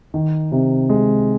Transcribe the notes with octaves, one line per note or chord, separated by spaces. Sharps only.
D#3
C3
G#3